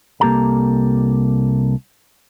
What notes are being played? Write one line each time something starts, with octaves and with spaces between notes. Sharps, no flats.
C2 A#3 G4 A4 A#5